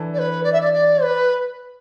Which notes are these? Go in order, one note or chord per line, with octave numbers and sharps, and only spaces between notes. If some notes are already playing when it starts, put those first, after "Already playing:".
Already playing: E3 D4 A4
D5
B4
D5
E5
D5
D5
B4